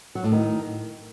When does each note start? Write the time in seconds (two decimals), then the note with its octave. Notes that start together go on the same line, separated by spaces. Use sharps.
0.15 F#3
0.24 A2
0.32 D#3